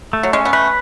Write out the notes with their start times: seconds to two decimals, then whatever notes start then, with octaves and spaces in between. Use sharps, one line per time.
0.13 A3
0.23 F#3
0.33 G#3 C#4
0.45 B3
0.53 A3 B4